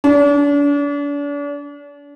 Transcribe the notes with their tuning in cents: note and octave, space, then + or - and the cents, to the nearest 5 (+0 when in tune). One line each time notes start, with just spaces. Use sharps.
D4 -40